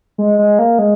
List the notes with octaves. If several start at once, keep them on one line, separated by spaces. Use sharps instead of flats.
G#3
G#3
A#3
G#3